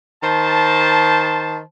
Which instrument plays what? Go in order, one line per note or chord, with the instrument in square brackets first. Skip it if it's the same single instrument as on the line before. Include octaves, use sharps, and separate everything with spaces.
[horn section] D#3 C5 A5